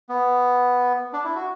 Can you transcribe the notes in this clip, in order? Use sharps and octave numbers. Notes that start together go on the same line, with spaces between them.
B3
D4
E4
F#4